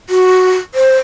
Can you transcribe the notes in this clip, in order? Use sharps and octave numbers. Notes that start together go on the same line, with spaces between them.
F#4
C5